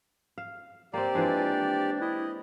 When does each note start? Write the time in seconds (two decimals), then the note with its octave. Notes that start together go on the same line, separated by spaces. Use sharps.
0.38 F5
0.94 A#3 C4 G4 D5
1.15 E3 F3 G#3 D4
2.01 E4 D#5